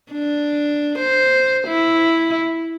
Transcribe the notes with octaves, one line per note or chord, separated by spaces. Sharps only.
D4
C5
E4